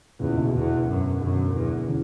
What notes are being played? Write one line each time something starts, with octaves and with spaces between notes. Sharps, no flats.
E2 A#2 C#3
B2 D3
E2
F#2
F#2 B2 D3
E2
C#3 E3